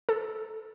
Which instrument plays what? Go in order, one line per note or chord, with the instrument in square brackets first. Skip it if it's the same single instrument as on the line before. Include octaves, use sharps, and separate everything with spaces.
[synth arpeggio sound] A4